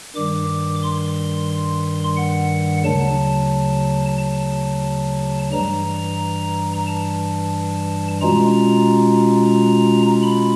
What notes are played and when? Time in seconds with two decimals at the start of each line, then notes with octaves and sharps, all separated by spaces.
0.15 G2 D#3 G3 D6
0.83 C6
2.17 F#5
2.84 D2 C#3 F#3 A5
4.18 A5
5.52 G2 E3 G3 A#5
6.87 A5
8.21 B2 G#3 C#4 F4 A#5
10.22 B5